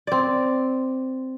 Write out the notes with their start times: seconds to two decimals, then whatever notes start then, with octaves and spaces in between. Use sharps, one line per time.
0.07 C4 D5